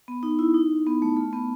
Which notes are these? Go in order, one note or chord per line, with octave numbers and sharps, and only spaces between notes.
B3
D#4
E4
D#4
B3
A3
A3
B3